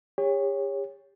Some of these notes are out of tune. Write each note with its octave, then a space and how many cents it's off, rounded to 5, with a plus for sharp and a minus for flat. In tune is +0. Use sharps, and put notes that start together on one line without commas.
G4 +45 C#5 +0